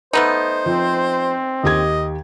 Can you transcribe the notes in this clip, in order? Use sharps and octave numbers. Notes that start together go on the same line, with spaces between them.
A3 B3 D#4 C5
F3 C4
D#2 G4 D#5 G#6